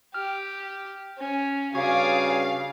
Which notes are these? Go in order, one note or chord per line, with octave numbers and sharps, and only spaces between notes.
G4 F6
C#4
G2 C#3 F#4 G#4 D5 F5 C#6 G#6